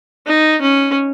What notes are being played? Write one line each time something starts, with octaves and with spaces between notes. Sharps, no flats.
D#4
C#4